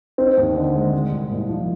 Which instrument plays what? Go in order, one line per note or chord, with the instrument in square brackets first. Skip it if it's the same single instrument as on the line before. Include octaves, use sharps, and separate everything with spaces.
[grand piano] C4 [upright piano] D#4
[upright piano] D#2
D3
G#3
G#3
C2
A#2
F3